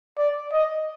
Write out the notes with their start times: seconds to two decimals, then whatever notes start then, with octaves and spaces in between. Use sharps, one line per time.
0.18 D5
0.53 D#5